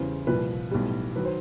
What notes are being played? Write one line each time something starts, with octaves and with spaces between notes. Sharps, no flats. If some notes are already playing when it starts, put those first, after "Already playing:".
Already playing: E2 C#3 E3 G3 C5
C2 A#2 F3 B4
B1 A2 E3 G3
D#3 F#3 B4
C5